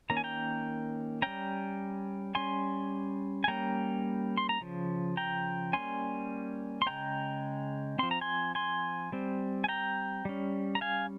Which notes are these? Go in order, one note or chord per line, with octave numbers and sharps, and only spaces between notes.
D#3 A#3 C#4 A#5
G#5
G5 A#5
G3 C#4 G5 A#5
G3 C#4 G#5 C6
G#5
G3 A#3 C#4 G5 A#5
C6
A#5
C#3 F3
G5 A#5
G3 A#3 C#4 G#5 C6
C6
C#3 G#3 C4 G5 A#5
F3 C4 C6
A#5
G#5 C6
G#5 C6
G3 C4
G#5
G5 A#5
G3 C#4
A#5
F5 G#5